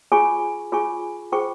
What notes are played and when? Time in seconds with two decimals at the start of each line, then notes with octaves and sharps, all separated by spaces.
0.12 F4 G#4 C#5 G#5 C#6
0.72 F4 G#4 C#5 G#5 C#6
1.32 F4 G#4 C5 G5 C#6